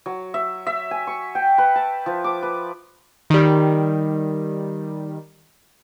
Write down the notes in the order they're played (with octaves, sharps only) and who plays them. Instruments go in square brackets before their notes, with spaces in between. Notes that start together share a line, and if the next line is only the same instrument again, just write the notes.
[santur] F#3
E5
E5
G#5
C#6
G5
B4
A5
F3
D6
B4
[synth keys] D#3 G3